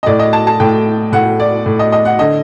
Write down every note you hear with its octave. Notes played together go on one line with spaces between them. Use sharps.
D#5
A2 D5
D#5
A5
A5
A2 G5
A2 F#5
D5
A2
D#5
D#5
F#5
D3 D#5